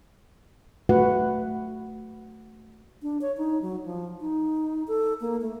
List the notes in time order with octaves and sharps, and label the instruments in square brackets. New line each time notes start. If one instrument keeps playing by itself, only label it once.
[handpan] A3 F#4 B4 F#5
[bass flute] D4
C#5
D#4
F#3
F3
D#4
A4
A#3
A3